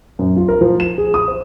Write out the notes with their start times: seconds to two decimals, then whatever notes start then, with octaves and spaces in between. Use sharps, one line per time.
0.19 F#2
0.36 F4
0.48 A#4
0.61 F3
0.80 E7
0.98 G#4
1.14 D#6
1.28 C5